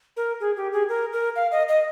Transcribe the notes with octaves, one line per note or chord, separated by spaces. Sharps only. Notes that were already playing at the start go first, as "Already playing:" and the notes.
A#4
G#4
G4
G#4
A#4
A#4
F5
D#5
D#5